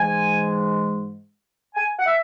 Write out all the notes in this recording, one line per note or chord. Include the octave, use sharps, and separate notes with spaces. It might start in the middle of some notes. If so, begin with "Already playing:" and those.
Already playing: G#2 E3 G#3 G#5
G#5
F#5
E5